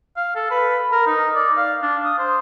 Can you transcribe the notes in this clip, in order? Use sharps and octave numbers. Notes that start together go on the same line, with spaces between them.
F5
A4
B4
A#4
D#4
D5
F5
D4
D#6
C5